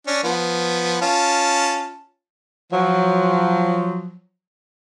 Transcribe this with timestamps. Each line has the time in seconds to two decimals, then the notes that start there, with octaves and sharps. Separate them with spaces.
0.07 C#4 D4
0.24 F3 B3
1.02 C#4 F4 A5
2.72 F3 F#3